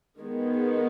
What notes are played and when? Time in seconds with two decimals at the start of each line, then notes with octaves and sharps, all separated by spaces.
0.18 D#3 G#3 B3